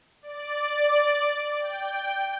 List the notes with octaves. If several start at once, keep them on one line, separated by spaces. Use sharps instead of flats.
D5
G5